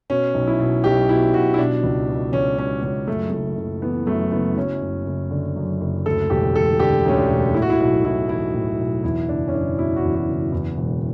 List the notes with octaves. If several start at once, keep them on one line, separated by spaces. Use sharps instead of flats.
B2 C#4
B1
E4
B2
B1 G4
B2 E4
B1 F#4
E4
B2 D4
C#2
B2
C#2 C#4
B2 C#4
C#2 C#4
F#2 A3
F#1 A3
F#1
E3 B3
F#2 A3
F#1 B3
F#2 C#4
F#1
F#1
D3
F#2
F#1
D2 A4
E1 G4
E1 A4
D3 G4
D2 C#4
D4
E1
A2 E4
F#4
E4
B1 F#4
B1 E4
E3 E4
A2
B1
E2 E4
F#1 D4
C#4
F#1 D4
B2 E4
F#4
E2
F#4
F#1
E2
E1